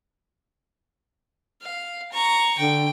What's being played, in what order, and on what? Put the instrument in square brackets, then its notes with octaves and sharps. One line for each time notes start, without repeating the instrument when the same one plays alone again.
[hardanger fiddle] F5
A#5 C#6
[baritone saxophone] D3 [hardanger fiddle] G5